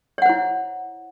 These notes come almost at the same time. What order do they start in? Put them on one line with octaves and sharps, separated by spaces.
C#5 F#5 C5 E4